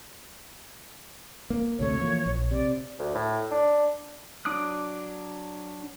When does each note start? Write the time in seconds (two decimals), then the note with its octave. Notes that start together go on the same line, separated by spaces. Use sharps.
1.50 A#3
1.79 D2 C3 A3 C#5
2.00 E3 F3 A#3
2.26 A#1
2.51 C3 D5
2.99 D2
3.15 A2
3.51 D4
4.45 F#3 D4 D6 D#6 F#6